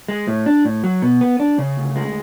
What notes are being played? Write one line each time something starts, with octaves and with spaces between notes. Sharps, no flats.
G#3
A2
D4
A2
F#3
B2
B3
D4
C#3
D2
G#3